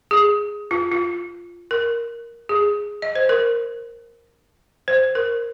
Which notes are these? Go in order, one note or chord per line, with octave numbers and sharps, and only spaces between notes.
G#4
F4
F4
A#4
G#4
D#5
C5
A#4
C5
A#4